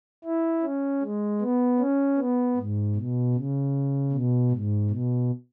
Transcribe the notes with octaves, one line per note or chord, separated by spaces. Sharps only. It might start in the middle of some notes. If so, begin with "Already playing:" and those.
E4
C#4
G#3
B3
C#4
B3
G#2
B2
C#3
B2
G#2
B2